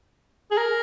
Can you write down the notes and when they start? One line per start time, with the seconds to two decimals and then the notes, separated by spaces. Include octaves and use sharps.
0.51 G#4
0.58 A#4